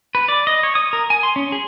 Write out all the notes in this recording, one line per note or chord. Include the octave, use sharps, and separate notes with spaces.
B4
D5
D#5
C#5
D#6
A#4
G#5
C6
C#4
G#4